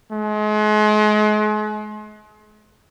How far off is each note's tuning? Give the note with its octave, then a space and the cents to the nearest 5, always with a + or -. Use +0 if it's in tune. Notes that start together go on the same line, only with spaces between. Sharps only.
G#3 +40